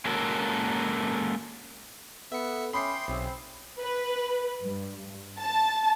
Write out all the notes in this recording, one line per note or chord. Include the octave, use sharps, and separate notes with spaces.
G#3 A#3 C#4 F#4 A4 A#4
B3 A4 E5 C#7
C#4 E5 G5 B5 C6 D6 D#6 C7
B1 C#3 C4
B4
G2
A5